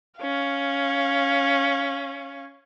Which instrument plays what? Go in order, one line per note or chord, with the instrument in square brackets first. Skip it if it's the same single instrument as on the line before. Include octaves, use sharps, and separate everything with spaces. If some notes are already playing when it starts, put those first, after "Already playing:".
[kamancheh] C#4 F5